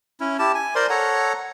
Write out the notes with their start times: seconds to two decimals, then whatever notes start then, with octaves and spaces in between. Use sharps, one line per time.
0.20 C#4 E4
0.39 E4 G4 A5
0.54 G#5
0.75 A#4 C5 D5 C6
0.90 A4 C#5 F#5 A#5